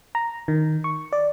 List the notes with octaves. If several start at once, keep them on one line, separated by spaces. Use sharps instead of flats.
A#5
D#3
C#6
D5